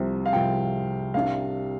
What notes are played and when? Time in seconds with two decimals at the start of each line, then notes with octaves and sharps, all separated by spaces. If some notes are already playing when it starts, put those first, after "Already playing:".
Already playing: C2 C3 F3 C4
0.26 F5
0.33 C2 C3 F3 C4 G5
1.14 C2 C3 G3 D4 F5